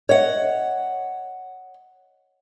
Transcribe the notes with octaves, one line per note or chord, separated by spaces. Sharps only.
C#5 D#5 F#5